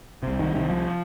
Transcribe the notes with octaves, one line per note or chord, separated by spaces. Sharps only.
C2 C3
D#3
C2 C3 D#3
F3